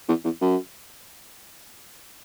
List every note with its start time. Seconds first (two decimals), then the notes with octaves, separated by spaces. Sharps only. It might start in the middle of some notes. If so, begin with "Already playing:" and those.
0.08 E2
0.24 E2
0.41 F#2